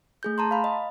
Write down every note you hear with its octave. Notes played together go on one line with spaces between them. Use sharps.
A3 G#4 G6
A5 A#5 C6
F5 B5
D#5